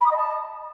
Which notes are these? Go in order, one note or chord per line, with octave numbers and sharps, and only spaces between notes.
B5
D#6
D#5
A5